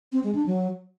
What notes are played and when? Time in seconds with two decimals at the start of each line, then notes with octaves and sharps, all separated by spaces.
0.12 C4
0.24 G#3
0.35 D4
0.46 F#3